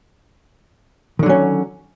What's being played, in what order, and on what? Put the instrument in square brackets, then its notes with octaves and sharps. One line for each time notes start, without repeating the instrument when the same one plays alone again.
[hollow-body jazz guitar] D#3
D3
F#3
C#4